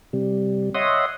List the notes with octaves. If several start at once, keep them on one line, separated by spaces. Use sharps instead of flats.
C3 G3
C#5 D#5 E5 F#5 C6 D#6